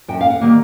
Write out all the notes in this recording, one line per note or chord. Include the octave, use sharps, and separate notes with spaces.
F#2 G5
F5
F#5
D#3 G3 A#3